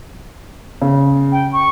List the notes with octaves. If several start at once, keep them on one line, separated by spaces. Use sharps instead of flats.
C#3
G5
C#6